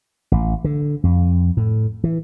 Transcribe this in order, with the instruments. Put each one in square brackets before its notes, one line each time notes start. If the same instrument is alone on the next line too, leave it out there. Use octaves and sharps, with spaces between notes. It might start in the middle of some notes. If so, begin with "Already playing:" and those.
[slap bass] A1
D3
F2
A2
E3